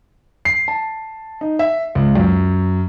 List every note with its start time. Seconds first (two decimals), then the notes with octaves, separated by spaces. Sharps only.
0.45 C7
0.68 A5
1.41 D#4
1.59 E5
1.95 C#2
2.16 F#2